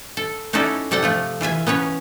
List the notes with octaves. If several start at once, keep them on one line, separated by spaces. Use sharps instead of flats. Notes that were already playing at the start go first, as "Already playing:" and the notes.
A4
C#4 D#4 E4 F#4 A4 D5
C3 A4 D5 F#5 G5
F3 A3 F4
E3 F4 E5 G#5
B3 C#4 B4 C#5